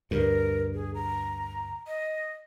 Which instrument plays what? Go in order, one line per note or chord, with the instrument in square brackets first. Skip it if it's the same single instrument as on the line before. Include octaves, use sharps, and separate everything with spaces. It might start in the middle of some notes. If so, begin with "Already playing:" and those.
[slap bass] D2 G2 [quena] A#4
[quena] G#4
A#5
D#5